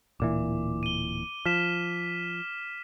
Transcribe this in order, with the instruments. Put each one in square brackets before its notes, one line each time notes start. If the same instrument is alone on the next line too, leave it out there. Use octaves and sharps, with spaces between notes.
[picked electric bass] D1 A#2 E3 [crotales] D6
[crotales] D#7 G7
[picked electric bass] F3 [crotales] F6 B6 E7